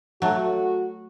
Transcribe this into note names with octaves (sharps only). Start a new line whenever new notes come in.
F#3 A3 F#4